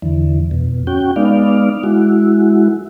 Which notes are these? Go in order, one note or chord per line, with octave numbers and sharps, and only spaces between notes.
E2 D3 E3
F2 B2
C#4 F#4 G5
G#3 B3 D#4 D5 F5
G#3 E4 F#4